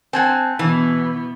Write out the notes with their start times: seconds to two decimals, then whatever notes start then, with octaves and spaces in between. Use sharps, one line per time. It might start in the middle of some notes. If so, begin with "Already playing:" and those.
0.13 C4 F#5 G#5 A5
0.59 B2 E3 B3